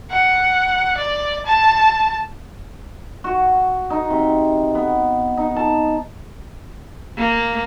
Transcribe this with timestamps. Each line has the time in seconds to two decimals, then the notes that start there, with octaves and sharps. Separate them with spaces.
0.11 F#5
0.97 D5
1.46 A5
3.24 F#4
3.90 D#4
4.10 C3
4.75 B3
5.37 D#4
5.56 A5
7.18 A#3